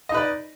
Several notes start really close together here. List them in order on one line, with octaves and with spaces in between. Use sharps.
D#5 D#4 B4 D5